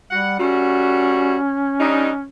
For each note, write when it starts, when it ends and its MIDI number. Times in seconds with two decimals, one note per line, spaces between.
0.11 0.35 55
0.11 0.35 78
0.40 1.36 55
0.40 1.36 57
0.40 2.28 61
0.40 1.36 66
1.80 2.10 55
1.80 2.10 62
1.80 2.10 63